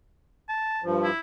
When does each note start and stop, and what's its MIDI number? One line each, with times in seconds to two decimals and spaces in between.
0.49 0.82 81
0.83 1.10 43
0.83 1.10 53
1.04 1.19 64